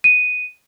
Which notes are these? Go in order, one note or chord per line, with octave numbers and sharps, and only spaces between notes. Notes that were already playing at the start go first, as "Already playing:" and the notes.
D#7